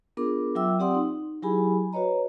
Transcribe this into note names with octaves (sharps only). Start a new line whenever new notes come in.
B3 D4 F4 G#4 A#4 D6
F#3 F4 E5 G5 D6 E6
C4 G4 D5 F#5 C6 D#6
D#4
F#3 E4 G4 G#4 G#5 B5
F#4 B4 C#5 D#5 A#5